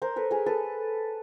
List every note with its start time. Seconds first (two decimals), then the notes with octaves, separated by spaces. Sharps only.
0.02 A#4 C5
0.16 A4 B4
0.31 G#4 A#4
0.46 A4 B4